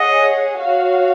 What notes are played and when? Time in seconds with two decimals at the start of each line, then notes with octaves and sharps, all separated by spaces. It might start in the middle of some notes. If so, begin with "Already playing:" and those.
Already playing: G#4 C#5 D#5 F#5
0.60 F#4 C#5 F5